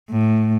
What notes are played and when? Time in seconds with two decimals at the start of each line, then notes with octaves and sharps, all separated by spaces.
0.11 A2